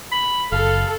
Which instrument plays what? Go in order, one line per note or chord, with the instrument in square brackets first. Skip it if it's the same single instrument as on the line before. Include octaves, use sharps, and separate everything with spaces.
[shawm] B5
[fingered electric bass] F#1 [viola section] A4 [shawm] F5